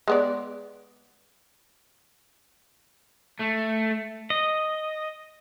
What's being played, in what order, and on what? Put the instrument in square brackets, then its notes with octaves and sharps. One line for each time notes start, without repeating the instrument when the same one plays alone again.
[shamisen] G#3 B3 D5
[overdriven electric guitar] A3
[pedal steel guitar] D#5